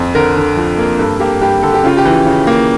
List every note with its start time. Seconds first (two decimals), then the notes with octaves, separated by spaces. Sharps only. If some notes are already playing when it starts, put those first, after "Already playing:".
Already playing: F2
0.15 D3 A#4
0.36 D3
0.57 F3
0.78 A#3
0.99 G2 A4
1.20 A#3 G4
1.41 G2 G4
1.63 D3 A4
1.74 G4
1.84 C#3 F4
1.97 G4
2.05 E3
2.26 C#3
2.47 A#3